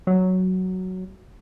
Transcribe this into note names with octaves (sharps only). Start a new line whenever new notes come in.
F#3